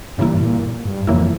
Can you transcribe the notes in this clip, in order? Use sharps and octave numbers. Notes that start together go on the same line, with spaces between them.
G2 C#3 E3 A#3 E4
A#2
G2
F2 C#3 E3 A#3 E4